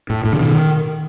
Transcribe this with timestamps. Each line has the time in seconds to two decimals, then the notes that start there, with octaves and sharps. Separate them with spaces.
0.10 A2
0.25 A2
0.33 D3
0.39 B2 D#3